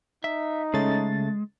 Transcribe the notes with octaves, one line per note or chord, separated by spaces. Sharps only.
D#4 E5
C#3 G#3 A3 A6